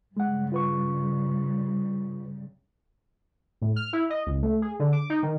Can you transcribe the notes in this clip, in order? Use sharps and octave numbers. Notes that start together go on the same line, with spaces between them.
G2 C#3 G3 G#3 F#5
F4 B4 C#6
A2
F6
E4
D#5
C#2
A3
G#4
D3
D6
D#4
D#3